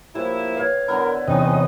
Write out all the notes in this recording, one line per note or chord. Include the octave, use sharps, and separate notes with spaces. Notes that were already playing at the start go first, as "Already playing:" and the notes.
A2 F3 A#3 E4 G4 C5
B4 C#5 F5 G#6
D3 B3 E4 A#4
E2 C3 C#4 D#4 D#5 G5